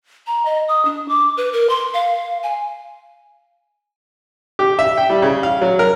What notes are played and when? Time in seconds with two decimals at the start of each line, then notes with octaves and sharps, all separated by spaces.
0.27 A#5
0.45 D#5
0.69 D#6
0.85 D4
1.08 D6
1.37 B4
1.53 A#4
1.70 C6
1.94 F5
2.43 G#5
4.59 G4
4.79 E5
4.98 G5
5.10 G3
5.22 C#3
5.43 F5
5.61 F#3
5.79 A#4